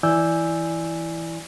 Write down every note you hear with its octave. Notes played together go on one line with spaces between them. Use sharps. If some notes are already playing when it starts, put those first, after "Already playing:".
E3 E4 D5 G#5 E6 G6